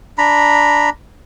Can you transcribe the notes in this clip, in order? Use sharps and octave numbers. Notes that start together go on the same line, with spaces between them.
D4 A#5 B5